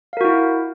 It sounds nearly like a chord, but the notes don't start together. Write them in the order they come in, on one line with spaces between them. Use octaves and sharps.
F5 A#4 F#4 E4